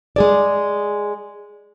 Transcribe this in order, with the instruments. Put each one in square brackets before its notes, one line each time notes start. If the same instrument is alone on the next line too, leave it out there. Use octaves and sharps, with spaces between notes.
[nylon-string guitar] G#3 G#4 D5